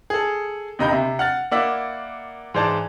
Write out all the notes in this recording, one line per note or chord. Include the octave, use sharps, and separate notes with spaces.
G#4 A4
D#2 C3 D#5 A#5 B5 G6
C3 E5
F#5 F6 A6
A#3 E4 D5 F#5 E6 B6
G#2 E3 C5 D5 A5